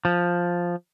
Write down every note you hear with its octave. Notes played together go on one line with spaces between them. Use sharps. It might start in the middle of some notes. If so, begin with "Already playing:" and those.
F3